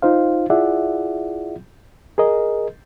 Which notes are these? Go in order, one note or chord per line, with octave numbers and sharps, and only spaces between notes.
D#4 F4 C5 F5
E4 F4 G#4 D5 E5 F#5
G#4 A#4 D#5